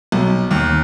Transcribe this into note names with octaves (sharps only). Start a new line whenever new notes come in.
B1
D#2